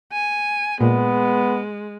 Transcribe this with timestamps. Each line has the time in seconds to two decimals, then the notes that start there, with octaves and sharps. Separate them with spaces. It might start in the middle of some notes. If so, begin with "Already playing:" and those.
0.13 G#5
0.80 A#2 G#3 B3